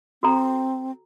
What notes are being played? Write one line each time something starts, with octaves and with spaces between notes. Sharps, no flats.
C4 F#4 A4 A#5